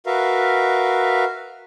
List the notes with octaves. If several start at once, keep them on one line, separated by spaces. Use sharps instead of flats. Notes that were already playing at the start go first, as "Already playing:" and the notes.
F#4 A#4 B4 E5 F5